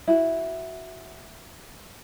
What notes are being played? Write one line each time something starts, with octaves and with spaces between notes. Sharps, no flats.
E4 F#4